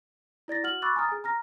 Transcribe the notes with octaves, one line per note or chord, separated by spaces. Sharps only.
E4 D5 A6 A#6
F#4 F#5 F6 F#7
B5 C#6 D6 E6 F#6 A6
G#5 A#5 D#6 F6 A6
G#4 G#5
A#5 F6 A#6